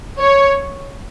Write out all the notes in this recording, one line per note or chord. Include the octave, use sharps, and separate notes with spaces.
C#5